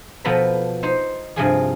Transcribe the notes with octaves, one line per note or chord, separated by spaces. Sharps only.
B2 F3 B3 A4 A#5 B5
D#4 C5
G2 C3 F3 G#4